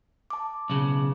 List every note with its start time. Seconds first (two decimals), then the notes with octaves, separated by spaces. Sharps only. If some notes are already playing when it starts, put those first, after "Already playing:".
0.30 A5 D6
0.70 B1 C#3